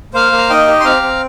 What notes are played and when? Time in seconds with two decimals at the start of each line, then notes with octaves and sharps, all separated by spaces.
0.14 A#3 C5 F5
0.32 A#3
0.38 A#5
0.49 D#4 D#5 G5
0.68 G4
0.80 C6
0.84 C4 F5 A#5
1.02 C4